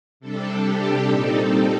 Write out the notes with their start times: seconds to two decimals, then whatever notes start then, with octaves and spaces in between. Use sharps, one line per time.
0.20 C3 G3 D4 A4
0.62 G4
1.04 A#2 G3 C4 D#4 A4